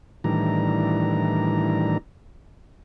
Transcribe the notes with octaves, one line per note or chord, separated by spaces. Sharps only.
A2 D#3 E3 G3 D4 A#5